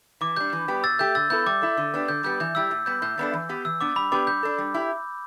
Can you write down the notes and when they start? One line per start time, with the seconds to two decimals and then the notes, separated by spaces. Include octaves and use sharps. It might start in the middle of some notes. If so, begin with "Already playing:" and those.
0.21 E3 D6
0.37 G3 D4 G6
0.53 E3
0.68 G3 B3 G4
0.84 B2 E6 A6
0.99 A3 G4 G6
1.15 D3 E6 A6
1.30 B3 E4 A4 G6
1.46 G3 D6
1.62 E4 A4
1.77 D3
1.94 B3 D4 G4
2.08 D3 G6
2.24 G3 B3 G4 G6
2.40 E3 G6
2.55 G3 E4 G4 E6
2.71 A2
2.86 G3 B3 G6
3.02 A2 G6
3.18 G3 B3 D4 A4
3.33 E3
3.49 B3 G4
3.65 E3 E6
3.81 B3 D4 D6
3.96 G3 B5
4.12 B3 D4 G4 D6
4.27 G3 G6
4.43 D4 A4
4.58 G3
4.74 E4 G4